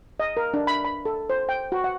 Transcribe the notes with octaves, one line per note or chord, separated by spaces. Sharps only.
D#5
A#4
D4
B5
B5
A4
C5
G5
F#4
F#5